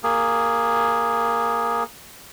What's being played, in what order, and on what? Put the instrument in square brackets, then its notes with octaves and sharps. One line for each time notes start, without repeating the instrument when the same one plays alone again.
[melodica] A#3 G#4